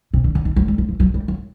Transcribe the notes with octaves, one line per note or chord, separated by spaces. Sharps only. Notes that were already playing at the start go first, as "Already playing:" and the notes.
C3
D3
D3
D#3
F#3
G3
F#3
F3
F#3
G3
F#3